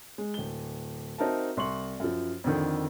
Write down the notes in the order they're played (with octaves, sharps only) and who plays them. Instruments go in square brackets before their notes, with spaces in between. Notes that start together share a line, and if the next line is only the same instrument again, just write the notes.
[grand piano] G#3
D1 G7
C4 D#4 F#4 A#4 E5 A5
C2 C6 C#6 F#7
F#2 F3
F2 D3 D#3